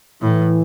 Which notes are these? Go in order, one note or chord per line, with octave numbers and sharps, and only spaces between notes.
A2 E3